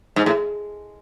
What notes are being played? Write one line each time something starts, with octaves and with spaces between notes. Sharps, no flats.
G#2
A2